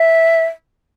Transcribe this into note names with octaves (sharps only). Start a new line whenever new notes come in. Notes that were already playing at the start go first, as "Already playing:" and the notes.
Already playing: E5